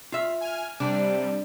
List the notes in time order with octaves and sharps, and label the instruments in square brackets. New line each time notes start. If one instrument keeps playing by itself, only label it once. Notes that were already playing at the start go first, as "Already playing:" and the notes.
[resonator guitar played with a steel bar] F4 E5
[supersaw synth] G#5 F6
[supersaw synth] C3 G3 [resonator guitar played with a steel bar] D4